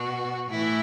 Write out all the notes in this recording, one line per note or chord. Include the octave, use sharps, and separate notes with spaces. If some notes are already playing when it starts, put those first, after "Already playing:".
Already playing: B2 F#4
A2 E3 E4